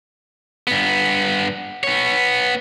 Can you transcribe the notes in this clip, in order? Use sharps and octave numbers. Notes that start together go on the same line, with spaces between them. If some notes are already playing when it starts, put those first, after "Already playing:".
G2 B3
B3 C#5